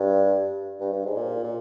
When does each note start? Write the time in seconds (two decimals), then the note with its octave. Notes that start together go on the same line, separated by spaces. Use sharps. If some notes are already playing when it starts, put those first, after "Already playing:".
Already playing: G2
0.80 G2
0.93 G2
1.05 G#2
1.17 A#2
1.44 A#2